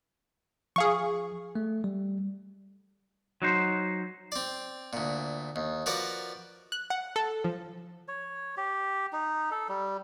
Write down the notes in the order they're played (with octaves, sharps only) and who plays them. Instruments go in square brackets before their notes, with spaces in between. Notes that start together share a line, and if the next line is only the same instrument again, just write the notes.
[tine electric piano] F3 [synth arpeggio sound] G#4 F5 C#6
[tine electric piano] A3
G3
[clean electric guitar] F#3 D#4 C5
[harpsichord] C4 D5
D2 A#2
D#2
F3 F#4 A#4 B4 D5
[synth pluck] F#6
F#5
A4
F3
[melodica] C#5
G4
D#4
A4
G3